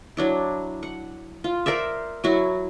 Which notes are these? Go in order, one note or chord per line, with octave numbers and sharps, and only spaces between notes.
F#3 D4 E4
F#5
F4
A#4 C5 D5 E5
F#3 E4 F#4